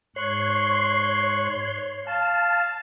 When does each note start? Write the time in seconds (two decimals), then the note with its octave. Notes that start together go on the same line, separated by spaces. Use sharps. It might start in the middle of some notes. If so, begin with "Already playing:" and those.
0.16 G#2 C#5 C6 C#6 F#6
2.07 F5 A5